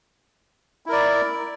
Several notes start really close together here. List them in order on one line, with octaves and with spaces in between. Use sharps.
E4 A#4 D5